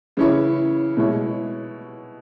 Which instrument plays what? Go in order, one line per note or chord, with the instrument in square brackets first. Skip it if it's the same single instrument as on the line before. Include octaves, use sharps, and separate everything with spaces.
[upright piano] C#3 E3 C#4 E4 C#5
B2 G#3 E4 C#5